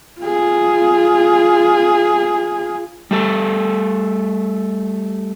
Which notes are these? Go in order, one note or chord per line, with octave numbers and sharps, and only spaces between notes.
F4 G#4
G3 A3 A4